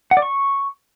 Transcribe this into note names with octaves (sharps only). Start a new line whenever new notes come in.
F#5
D5
C#6